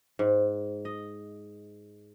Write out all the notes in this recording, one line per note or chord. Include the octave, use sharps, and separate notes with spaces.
G#2
D#5